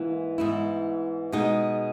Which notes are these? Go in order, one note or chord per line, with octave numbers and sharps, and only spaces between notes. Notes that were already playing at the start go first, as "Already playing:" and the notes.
Already playing: G#2 E3 A#3
G#2 E3 B3 E4
B2 G#3 B3 D#4